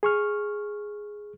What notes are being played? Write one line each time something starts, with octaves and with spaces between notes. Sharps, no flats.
G#4 C#6 F6